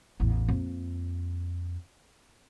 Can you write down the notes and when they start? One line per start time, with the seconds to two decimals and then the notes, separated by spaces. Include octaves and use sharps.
0.20 A1 E2
0.48 F2 A#3